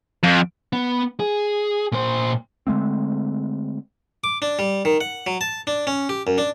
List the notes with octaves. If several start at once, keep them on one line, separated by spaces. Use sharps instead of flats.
F2
B3
G#4
A#2 C5
D3 G#3 A3 C4
D6
D4
G3
D#3
F#5
F#3
A5
D4
C#4
G4
F#2
D4